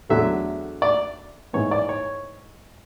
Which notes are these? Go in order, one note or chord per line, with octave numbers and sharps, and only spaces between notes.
E2 D3 F#3 A3 E5
D5
G#2 E3 B3 C#5
D5
C#5